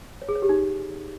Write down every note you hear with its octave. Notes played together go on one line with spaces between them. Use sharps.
C#5
G#4
C#5
G4
D#4